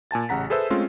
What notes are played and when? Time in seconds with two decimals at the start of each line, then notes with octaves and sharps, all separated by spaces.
0.11 A#2 G#5 A5 A6
0.29 A1 C#3 F#5 A#5 B6
0.50 G#4 A4 B4 C5 E5 E6
0.70 G#3 A3 C4 C#4 F4